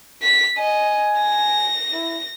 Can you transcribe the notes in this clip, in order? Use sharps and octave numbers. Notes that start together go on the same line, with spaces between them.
B6
D#5 G#5
A#6
E4